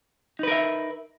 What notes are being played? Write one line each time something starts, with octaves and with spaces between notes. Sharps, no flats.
D#4 A#4 B4 E5